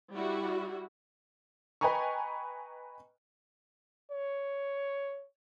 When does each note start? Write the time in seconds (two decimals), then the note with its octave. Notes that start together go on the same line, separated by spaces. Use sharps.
0.13 G3 E4 F#4
1.81 B4 D#5 G5 G#5 A#5 C#6
4.12 C#5